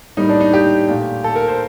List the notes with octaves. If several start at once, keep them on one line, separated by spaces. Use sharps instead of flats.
A2 G3 A#3 D#4
D4
D#4
G4
A#2 A3
A4
A#4
C5